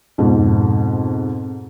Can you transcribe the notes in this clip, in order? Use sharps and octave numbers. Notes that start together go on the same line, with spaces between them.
F2 G#2 B2